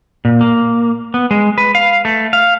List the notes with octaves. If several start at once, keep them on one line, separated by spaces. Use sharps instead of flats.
A#2
A#3
B3
G#3
B4
F5
A3
F5